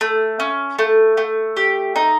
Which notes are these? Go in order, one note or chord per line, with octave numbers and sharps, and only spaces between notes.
A3
C#4
A3
A3
G4
D#4